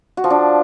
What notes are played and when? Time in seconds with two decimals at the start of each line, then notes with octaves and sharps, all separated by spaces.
0.17 F#4
0.24 F3
0.30 D4